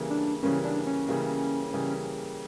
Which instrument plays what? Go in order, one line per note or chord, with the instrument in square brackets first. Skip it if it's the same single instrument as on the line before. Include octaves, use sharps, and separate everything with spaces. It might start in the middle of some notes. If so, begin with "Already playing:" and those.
Already playing: [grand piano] C#3 E3 G3 A#3
[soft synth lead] D4
[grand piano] C#3 E3 G3 A#3 [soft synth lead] C#4
[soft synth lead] D4
C#4
[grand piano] C#3 E3 G3 A#3
C#3 E3 G3 A#3